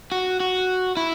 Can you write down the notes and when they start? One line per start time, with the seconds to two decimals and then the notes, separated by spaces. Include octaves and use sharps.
0.12 F#4
0.40 F#4
0.97 E4